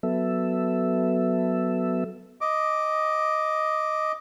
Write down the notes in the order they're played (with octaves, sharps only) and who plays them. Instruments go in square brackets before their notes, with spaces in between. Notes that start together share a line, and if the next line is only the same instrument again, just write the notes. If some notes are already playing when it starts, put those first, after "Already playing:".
[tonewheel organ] F#3 B3 A4 E5
[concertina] D#5 D6